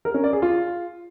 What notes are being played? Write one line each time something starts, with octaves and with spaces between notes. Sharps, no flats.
A#4
C#4
D5
G#4
F4